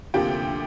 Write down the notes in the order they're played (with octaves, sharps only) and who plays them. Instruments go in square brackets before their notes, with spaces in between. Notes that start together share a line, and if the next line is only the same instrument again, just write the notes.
[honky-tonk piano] D2 C3 F3 A#3 G4 G5